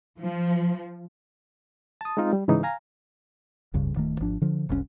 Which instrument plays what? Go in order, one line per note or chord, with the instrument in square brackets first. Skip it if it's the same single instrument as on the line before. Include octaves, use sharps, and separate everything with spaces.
[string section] F3
[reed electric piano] A5 D#6
G#3 C4 D#4 F4
G3
G#2 C#3 E3 D#4
F5 G#5 A#5
[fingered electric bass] F1 C#2 G2 C#3
D1 D#3 A3
G#1 F3 D4
D3 F3
F#1 C2 D3 C#4